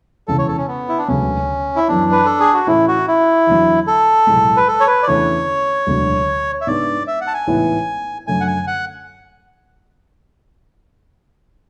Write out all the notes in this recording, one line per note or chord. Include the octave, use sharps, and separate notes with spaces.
E1 E2 C#3 A4
C#5
A4
C#4
B3
E4
D4
E1 D2 C#3 F#3 B3 C#4
E4
F#2 E3 B3 D4
B4
A4
G#4
F#4
A2 E3 A3 C#4 E4
F#4
E4
E2 D3 F#3
A4
B1 A2 G#3
B4
A4
C#5
B4
D5
E2 D3 A3 C#4 C#5
E1 D2 D3 F#3
E5
G#2 G#3 B3 D4 D5
E5
F#5
A5
G#5
A1 G#2 E3 B3 E4
F#2 D3 A3 G#5
F#5
G#5
F#5